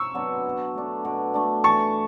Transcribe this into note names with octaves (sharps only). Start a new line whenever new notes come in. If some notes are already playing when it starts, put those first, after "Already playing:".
Already playing: C#6 E6
F#3 B3 D4
B2
A3 D4
B2
A3 D4
E3 A5 C#6